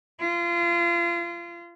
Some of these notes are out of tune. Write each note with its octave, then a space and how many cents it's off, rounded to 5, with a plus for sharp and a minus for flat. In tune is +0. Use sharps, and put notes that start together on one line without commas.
F4 -30